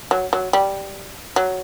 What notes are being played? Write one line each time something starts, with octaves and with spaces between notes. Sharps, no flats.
F#3
F#3
G3
F#3